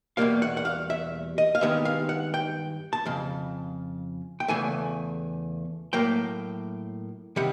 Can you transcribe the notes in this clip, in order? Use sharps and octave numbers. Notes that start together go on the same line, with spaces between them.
E2 B2 G3 A#3 F5
F#5
F#5
F5
E5
D#5
F5
G2 D#3 G#3 B3 E5
F5
F#5
G5
A5
F2 C#3
G5
E2 C#3 E3 A3 G#5
A2 F#3 A#3 G5
C3 D#3 G3 F#5